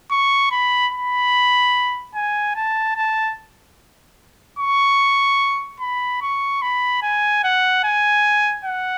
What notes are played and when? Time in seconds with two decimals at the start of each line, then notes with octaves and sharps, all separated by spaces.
0.11 C#6
0.51 B5
0.93 B5
2.15 G#5
2.56 A5
2.96 A5
4.59 C#6
5.80 B5
6.22 C#6
6.62 B5
7.03 G#5
7.44 F#5
7.84 G#5
8.65 F#5